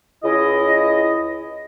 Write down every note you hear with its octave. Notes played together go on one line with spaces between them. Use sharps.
C#2 E4 D#5